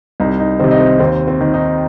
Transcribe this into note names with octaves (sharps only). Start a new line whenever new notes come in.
C2 D#4
D#4
C3 D#3 C4
D#4
C4
D#2 C4
C4
D#3
D#4